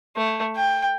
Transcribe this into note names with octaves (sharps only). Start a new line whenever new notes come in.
A3
G5